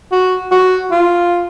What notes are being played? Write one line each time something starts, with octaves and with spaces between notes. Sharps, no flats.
F#4
F#4
F4